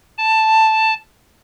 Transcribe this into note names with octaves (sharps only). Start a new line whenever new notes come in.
A5